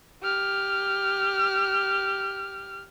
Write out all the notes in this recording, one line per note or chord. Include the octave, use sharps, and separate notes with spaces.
G4 F6